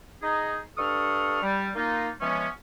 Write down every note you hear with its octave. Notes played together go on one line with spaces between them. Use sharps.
D#4 G#4
G2 D4 A4 C#6 D#6 F6
G3
A#3 D#4 F4
E3 F3 G#3 B3 C#4